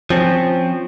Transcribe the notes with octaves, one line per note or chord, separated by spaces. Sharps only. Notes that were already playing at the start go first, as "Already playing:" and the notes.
F3 C4 C#4